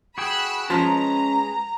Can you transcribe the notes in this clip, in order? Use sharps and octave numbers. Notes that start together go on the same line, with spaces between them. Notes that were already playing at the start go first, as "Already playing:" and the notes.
F#4 G#4 G5 B5 E6 F#6
F3 G#3 C#4 B4 A#5